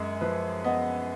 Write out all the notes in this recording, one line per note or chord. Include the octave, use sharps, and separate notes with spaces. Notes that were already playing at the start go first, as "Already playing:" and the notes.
Already playing: F#2 G#3 G#4
F3 B4
B3 D#5